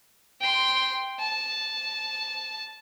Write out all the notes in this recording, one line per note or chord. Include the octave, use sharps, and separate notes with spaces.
G5 C6
A5